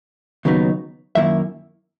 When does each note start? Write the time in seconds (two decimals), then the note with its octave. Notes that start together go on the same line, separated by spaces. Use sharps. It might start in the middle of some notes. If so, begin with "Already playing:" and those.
0.45 D#2 C#3 F#3 B3 D#4
1.15 F#2 D#3 A#3 E4 E5